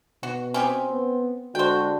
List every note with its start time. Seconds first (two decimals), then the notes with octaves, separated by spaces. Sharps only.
0.23 B2 F#4
0.54 C4 C#4 G4 G#4
0.91 B3
1.55 D3 G#3 F#4 C5 G5